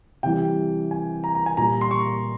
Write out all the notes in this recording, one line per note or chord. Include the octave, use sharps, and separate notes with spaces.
C3 E3 G3 G5
G#5
A#5
A#5
G#5
A#2 G3 A#5
C6
C#6